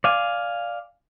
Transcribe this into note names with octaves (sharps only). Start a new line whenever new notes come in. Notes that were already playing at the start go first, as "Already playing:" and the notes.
D5 F5 G#5